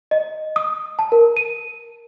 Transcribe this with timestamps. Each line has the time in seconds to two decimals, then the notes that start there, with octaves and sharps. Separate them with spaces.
0.11 D#5
0.56 D#6
0.99 A5
1.12 A#4
1.37 D#7